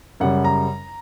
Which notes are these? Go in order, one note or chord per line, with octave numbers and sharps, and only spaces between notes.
F#2 C#3 G3 C#4 F#5
A#5